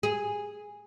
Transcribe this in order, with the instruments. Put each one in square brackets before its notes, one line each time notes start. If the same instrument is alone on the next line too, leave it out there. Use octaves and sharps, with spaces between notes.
[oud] G#4